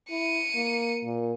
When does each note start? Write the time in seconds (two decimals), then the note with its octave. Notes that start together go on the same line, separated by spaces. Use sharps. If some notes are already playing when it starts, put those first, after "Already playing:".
0.10 E4 C#7 D#7
0.55 A#3
1.04 A#2